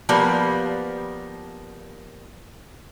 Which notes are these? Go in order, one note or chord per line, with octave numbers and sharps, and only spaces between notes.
F3 G3 A#3 B3